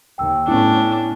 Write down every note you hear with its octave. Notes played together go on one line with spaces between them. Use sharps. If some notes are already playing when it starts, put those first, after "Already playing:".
D#2 G5 E6
A2 A3 B3 C#4 D4 E4